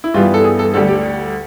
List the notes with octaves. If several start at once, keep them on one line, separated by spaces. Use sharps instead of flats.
E4
G2 E3 G3 B3 F4
A4
G#4
A4
D2 D3 G3 A4
G4